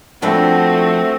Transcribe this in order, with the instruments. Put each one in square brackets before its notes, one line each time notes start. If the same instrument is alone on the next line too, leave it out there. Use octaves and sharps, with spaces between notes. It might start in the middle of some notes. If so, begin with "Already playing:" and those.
[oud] F3 D4 B4 [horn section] A3 [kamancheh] C4 F#4